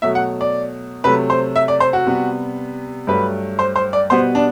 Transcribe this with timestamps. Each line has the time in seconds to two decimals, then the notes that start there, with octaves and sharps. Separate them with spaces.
0.02 B2 F#3 A3 E5
0.15 F#5
0.41 D5
1.04 C3 F#3 A3 B4
1.30 C5
1.56 E5
1.68 D5
1.80 C5
1.93 F#4
2.06 C3 G3 B3
3.07 G2 F#3 A3 B4
3.59 C5
3.76 C5
3.93 D5
4.10 B2 G3 B3 C5
4.35 D4